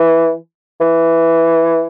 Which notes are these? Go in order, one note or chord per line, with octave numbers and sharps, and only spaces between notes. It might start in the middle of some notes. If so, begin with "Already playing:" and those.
Already playing: E3
E3